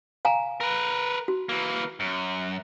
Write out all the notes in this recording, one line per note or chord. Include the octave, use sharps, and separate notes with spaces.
F5 G#5 A#5
A#4 B4
F#4
E3 A#3
F#2